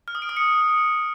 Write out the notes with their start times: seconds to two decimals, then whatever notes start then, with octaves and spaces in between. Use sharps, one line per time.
0.08 F6
0.15 D#6
0.22 D7
0.29 D#6
0.37 C#7